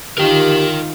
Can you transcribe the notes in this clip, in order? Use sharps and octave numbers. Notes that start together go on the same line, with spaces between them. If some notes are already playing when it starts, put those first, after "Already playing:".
D#3 F4 G4 A#4 G5